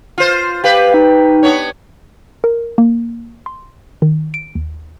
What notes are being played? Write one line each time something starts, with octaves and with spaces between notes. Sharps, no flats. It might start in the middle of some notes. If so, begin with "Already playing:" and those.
F4 C5
G4 B4 F5
D#4
B3 D4 C#5
A#4
A#3
C6
D#3
D7
D#2